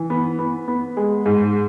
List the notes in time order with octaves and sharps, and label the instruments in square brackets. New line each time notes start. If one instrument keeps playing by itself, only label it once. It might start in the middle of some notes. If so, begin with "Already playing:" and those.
Already playing: [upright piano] E3
B3
B3
B3
G#3
G#2